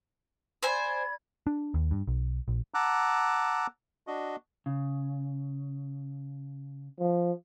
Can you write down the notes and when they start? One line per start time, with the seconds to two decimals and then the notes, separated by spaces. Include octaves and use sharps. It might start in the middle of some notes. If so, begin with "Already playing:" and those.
0.63 C5 D5 G#5 B5 G#6
1.47 D4
1.74 D#2
1.91 G2
2.07 B1
2.48 A#1
2.74 F#5 A5 A#5 D6 E6 F#6
4.07 D4 F#4 D#5
4.66 C#3
7.00 F3